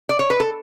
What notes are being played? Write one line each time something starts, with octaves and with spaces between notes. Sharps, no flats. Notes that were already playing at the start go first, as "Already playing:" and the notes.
D5
C#5
B4
A4